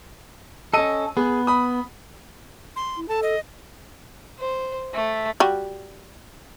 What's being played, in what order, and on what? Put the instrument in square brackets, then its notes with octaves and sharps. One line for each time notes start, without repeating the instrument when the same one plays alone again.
[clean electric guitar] C#4 A4 [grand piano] D#5 D#7
[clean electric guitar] B3 [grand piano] G#4
[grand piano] B5 D#6
[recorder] C6
[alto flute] E4
[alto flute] A4 [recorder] A5
[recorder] D#5
[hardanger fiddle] C5
A3
[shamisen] G3 F#4